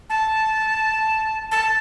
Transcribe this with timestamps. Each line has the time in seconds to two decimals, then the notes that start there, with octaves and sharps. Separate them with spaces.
0.10 A5
1.51 A5